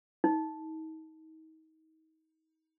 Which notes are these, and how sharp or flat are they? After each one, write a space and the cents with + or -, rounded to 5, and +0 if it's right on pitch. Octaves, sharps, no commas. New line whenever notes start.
D#4 +35